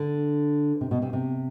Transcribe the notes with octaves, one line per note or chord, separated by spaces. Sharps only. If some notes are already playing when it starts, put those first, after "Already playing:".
Already playing: D3
C3
B2
C3
C3